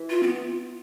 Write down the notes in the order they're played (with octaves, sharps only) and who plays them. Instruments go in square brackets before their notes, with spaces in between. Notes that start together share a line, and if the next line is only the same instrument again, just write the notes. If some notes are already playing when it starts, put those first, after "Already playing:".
Already playing: [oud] E3
[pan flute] F4
C4
B3